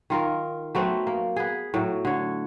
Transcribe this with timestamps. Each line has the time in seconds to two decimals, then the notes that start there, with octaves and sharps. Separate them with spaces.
0.10 D#3 F4 A#4
0.75 F#3 A3 B3 C4
1.07 A#3
1.36 B3 G#4
1.74 A2 F#3
2.05 D3 C#5